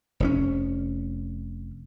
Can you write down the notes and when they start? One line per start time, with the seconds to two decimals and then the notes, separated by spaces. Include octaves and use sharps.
0.20 F1 A2 C#4